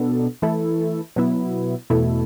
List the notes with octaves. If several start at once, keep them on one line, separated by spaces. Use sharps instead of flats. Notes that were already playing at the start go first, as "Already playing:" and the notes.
Already playing: B2 B3 D4 A4
E3 A3 E4 A4
B2 F#3 B3 E4
E2 B2 A3 E4 A4